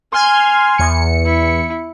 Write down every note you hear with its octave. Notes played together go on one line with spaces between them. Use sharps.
G#5 C6 F6 G#6
E2 C#7
E4